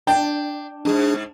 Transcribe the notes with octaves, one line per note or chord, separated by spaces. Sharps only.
D4 G5
F2 G#2 D4 G#4